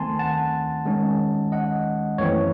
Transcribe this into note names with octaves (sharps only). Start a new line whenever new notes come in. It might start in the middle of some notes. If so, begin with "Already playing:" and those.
Already playing: D#3 A3 C4 G#5 A5 C6
F#5 A5
D#3 G#3 C#4
D#5 F#5
F#2 E3 A3 C4 C#5